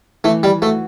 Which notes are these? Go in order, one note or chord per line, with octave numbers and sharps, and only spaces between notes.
E3 A3
G3
A3 F#4